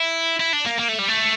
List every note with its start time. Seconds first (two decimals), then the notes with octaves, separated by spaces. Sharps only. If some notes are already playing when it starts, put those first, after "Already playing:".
Already playing: E4
0.40 E4
0.53 D4
0.66 A#3
0.79 A#3
0.89 A3
0.99 G3
1.09 A3